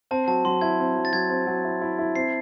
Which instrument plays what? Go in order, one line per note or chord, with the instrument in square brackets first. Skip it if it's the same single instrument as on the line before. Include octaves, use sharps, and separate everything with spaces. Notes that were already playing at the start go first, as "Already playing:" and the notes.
[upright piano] C4 [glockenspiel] A5
[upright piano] F#3 [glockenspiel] A5
[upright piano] F#3 [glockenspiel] C6
[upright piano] E4 [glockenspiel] G#6
[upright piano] C4
F#3
[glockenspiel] A6
[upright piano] F#3 [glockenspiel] G#6
[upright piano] C4
F#3
E4
E4
E4
[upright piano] C4 [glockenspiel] C7